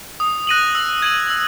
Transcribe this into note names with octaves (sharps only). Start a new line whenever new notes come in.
D#6
F#6 A#6 D#7 F#7
E6
G#6 D#7 F#7
E6